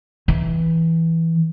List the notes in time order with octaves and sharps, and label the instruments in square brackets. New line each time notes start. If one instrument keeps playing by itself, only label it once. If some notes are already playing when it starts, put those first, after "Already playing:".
[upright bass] E3